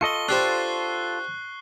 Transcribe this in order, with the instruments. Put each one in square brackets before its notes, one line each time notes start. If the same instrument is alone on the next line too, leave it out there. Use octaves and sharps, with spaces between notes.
[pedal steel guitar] F4 A4 D#5 [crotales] C#6 G7
[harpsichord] D4 G4 C5 [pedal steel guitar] F4 A4 [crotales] F#6 C7